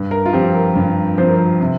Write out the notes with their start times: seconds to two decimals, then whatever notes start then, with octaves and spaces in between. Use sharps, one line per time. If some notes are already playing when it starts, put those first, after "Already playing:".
Already playing: G2
0.11 A#4
0.26 F4
0.33 F3 C4 G4
0.55 A#4
0.76 G2
1.18 F3 C4 C5
1.27 A#4
1.35 C5
1.60 C3